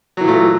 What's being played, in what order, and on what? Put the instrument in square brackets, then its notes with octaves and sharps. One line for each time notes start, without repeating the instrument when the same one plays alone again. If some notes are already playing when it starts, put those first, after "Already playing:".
[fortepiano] F#3
E3
A#2
A3